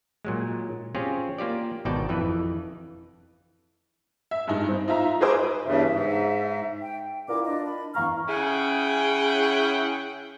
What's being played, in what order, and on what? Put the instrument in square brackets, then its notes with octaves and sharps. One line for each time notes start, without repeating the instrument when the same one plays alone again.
[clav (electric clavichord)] A#2 F#3 G#3
C4 C#4 F4 G4 G#4 C#5
A#3 F4 G4 D5
G#1 B2 D#4 D5 G5 A5
F2 E3 B4
[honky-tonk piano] E5
G2 G#3 D#4
C4
D#4 F4 E5 A#5
F#4 G#4 B4 C5 D#5 D6
B4
[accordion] E2 G2 C#3 [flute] E5
[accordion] G#2
[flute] G5
[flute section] E4 D6 [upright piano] F4 A#4 D5
[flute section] D4 D#5
B5
[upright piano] E2 F5 A#5 [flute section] C#6 F6
[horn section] C#3 C#4 E4 G#4 F#5 G5